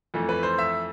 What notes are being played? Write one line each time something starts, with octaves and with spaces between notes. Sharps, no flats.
F2 E3 A3
B4
C5
E5